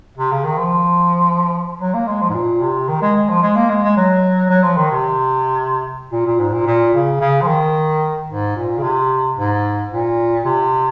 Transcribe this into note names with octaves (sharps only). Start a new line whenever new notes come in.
C3
C#3
D#3
F3
F#3
A#3
G#3
F3
G#2
A#2
C3
D#3
G#3
G#3
F3
G#3
A#3
G#3
G#3
F#3
F#3
F3
D#3
C3
A#2
A#2
G#2
A#2
A#2
C#3
C#3
F3
D#3
G#2
A#2
C#3
C3
G#2
A#2
C3